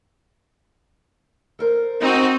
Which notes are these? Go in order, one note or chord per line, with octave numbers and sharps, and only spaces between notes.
A4 A#4 C5
C4 D#4 F#4